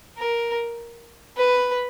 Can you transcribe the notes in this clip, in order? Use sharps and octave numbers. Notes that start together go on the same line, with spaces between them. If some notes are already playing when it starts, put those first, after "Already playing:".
A#4
B4